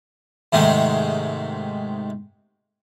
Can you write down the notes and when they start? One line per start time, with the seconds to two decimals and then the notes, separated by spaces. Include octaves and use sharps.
0.53 G#2 C3 D#3 G#3 A3